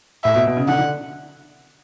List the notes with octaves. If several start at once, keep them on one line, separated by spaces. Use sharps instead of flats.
A2 E5
B2
B2
C#3
D3 F#5
D3